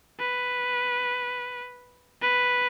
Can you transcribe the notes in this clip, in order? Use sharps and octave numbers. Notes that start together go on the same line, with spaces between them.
B4
B4